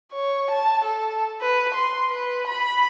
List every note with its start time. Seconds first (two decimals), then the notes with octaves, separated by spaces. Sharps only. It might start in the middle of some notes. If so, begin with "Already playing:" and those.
0.13 C#5
0.50 A5
0.84 A4
1.41 B4
1.74 C6
2.10 B4
2.47 B5